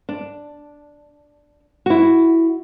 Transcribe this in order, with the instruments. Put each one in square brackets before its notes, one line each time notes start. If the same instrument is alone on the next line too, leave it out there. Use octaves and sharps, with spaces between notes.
[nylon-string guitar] D4
E4 F#4